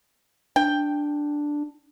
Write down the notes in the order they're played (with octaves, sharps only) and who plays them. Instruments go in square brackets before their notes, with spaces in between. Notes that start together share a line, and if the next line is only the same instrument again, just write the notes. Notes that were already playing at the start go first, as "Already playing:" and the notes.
[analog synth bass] D4 [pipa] G5